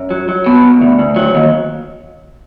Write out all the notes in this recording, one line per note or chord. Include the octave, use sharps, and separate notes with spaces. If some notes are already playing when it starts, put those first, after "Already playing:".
Already playing: F#2
F#3
F#3
B2
B1
D2
D2
F#3
D#2